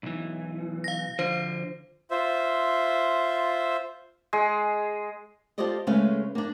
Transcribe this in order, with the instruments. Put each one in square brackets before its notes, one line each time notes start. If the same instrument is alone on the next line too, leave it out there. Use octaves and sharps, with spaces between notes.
[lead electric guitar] B1 E3
[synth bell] F5 A#6
[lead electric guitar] D3 F3 [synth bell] C5
[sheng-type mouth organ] F4 C5 E5
[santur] G#3
[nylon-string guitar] F4 G4 A4 C5 D5 D#5
C#3 G#3 A3 C#4 B4 F5
A#3 D4